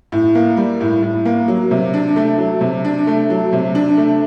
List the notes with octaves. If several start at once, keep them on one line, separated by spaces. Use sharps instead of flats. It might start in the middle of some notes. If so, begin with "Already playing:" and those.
A2
A#3
G3
A2
A2
A#3
F#3
C3
D4
A3
F#3
C3
D4
A3
F#3
C3
D4
A3